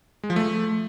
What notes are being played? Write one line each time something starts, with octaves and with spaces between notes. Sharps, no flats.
G#3
F3
A3